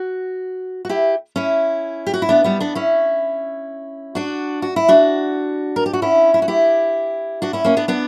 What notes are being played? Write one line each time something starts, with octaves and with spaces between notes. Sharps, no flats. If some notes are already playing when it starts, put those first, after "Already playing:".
Already playing: F#4
F#4
E4 G4
C#4 E4
G4
F#4
E4
B3 D4
G3 B3
B3 D4
C#4 E4
D4 F#4
F#4
E4
D4 F#4
A#4
G4
F#4
C#4 E4
E4
F#4
E4 G4
D4 F#4
C#4 E4
A#3 C#4
B3 D4
B3 D4